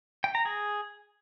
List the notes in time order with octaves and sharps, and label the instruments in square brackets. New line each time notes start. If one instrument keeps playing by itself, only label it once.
[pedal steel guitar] G5
A#5
G#4